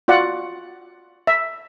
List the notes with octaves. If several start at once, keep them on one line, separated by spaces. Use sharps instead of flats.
F4 F#4 D5 F#5
E5